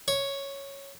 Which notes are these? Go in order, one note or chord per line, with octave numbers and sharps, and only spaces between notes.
C#5